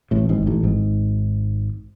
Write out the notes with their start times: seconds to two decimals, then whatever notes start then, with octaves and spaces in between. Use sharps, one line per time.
0.11 A1 A2
0.29 G#1 G#2
0.46 A1 A2
0.63 G#1 G#2